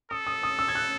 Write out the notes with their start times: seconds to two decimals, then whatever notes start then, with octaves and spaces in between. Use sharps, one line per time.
0.11 A4 D#6
0.27 D#6
0.43 D#6
0.59 E6
0.68 G#6
0.75 F#6